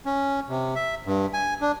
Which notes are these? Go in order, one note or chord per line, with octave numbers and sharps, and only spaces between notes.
C#4
C3
E5
G2
G#5
D4